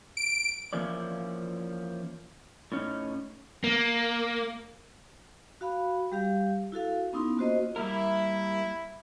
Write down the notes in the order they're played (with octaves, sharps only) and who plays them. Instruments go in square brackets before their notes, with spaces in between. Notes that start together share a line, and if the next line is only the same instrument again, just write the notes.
[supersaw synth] D7
[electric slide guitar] E3 F3 A#3 C#4 D5
A2 C#4 D#4
[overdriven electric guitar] A#3
[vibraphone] F#4 F5 B5
G3 G4 F5
E4 F#4 A4 F5
B3 C#4 D#4 E4 C6
A#3 F4 F#4 C5 D#5
[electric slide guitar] G3 A#3 A#4 [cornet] E4